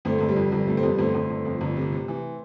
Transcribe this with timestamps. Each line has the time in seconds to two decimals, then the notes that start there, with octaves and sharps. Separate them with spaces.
0.05 G1 A3 C4
0.18 G1 A3
0.29 G3
0.36 F2
0.52 G1 G3
0.67 C3 A3
0.77 C4
0.83 F2 G3 B3
0.98 G1 A3 C4
1.14 G1
1.30 G1
1.45 F2
1.61 G1
1.77 C3
1.92 C3
2.08 E3